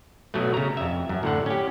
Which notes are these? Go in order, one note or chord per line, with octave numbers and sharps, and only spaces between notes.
B2 F#3 A3
C#3 A#5
F2 E5
F#2
A2 D3 F#5
C#4 G4